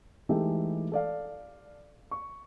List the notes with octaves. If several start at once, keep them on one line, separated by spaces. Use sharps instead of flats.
E3 G#3 A3 D#4 G4 A4
A4 D5 F5
C#6